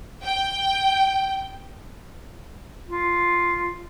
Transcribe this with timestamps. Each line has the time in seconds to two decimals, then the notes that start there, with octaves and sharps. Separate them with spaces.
0.23 G5
2.89 F4